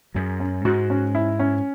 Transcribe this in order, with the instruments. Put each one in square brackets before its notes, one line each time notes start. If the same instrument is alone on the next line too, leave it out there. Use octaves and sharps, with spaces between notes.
[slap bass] F#2 F#3 [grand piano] G#4
[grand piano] C#4
[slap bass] G#2 G#3 [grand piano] F#4
[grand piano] C#4
E4
C#4